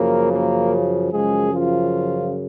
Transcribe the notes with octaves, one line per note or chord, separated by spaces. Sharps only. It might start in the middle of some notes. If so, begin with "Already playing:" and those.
Already playing: F#2 C#3 F3 A#3 A#4
A#3 A#4
F#2 C#3 F3 G#3 G#4
F3 F4